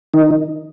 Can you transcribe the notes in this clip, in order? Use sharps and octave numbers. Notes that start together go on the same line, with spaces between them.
D#3 D#4